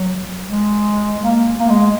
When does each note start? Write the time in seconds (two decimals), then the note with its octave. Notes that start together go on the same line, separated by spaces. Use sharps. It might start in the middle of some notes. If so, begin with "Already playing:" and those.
Already playing: F#3
0.48 G#3
1.21 A#3
1.60 A#3
1.69 G#3